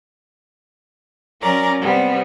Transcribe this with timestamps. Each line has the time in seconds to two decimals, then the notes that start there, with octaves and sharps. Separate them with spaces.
1.41 F#3 C#4 A#4 D5 A#5
1.80 C3 G3 B3 C4